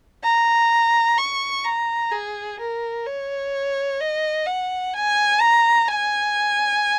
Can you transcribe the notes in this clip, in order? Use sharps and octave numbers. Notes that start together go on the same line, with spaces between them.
A#5
C#6
A#5
G#4
A#4
C#5
D#5
F#5
G#5
A#5
G#5